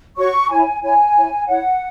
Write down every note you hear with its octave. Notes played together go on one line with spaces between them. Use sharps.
F#4 C#5 C#6
E4 C#5 G#5
E4 C#5 G#5
E4 C#5
E4 C#5 F#5